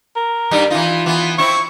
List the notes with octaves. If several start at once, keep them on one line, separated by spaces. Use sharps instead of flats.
A#4
G2 G3 D#4
E3 D#4 F4
E3 B3
C4 E4 C#6